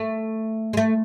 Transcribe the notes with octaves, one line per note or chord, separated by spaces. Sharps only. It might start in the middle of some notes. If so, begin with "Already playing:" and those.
Already playing: A3
G#3
A3